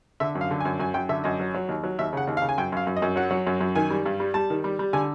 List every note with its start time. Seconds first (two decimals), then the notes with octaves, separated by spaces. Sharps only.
0.20 D3 E5
0.35 F#2
0.41 F5
0.51 D3
0.60 G#5
0.65 F#2
0.80 F#2 G#5
0.94 F#2 G5
1.09 D3 E5
1.24 F#2 D#5
1.40 F#3
1.54 F#3
1.68 D#2
1.84 F#3
1.98 D#2 E5
2.13 C#3 F#5
2.27 D#2
2.37 F5
2.42 C#3
2.49 G#5
2.58 F#2 G5
2.72 F#2 F5
2.87 F#2
2.97 D#5
3.02 F#2
3.16 F#3 F#5
3.31 F#3
3.47 F#2
3.61 F#2
3.75 D#3 G#5
3.90 G3
4.06 G2
4.20 G3
4.34 G3 A5
4.50 D#3
4.64 G3
4.79 G3
4.93 D3 G#5